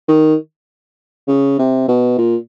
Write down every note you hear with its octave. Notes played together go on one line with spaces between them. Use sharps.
D#3
C#3
C3
B2
A#2